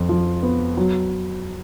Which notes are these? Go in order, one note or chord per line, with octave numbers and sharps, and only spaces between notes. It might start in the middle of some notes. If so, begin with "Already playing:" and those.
Already playing: F2
F3
B3
F#3